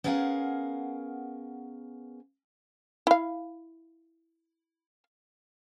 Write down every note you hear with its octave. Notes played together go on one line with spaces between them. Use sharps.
B3 C#4 G#4 A#4 F5 F#5
E4 F5